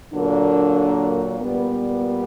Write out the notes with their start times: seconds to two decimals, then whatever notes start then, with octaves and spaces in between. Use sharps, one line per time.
0.13 A#2 D3 F#3 A#3 D4
1.41 A#2 G3 B3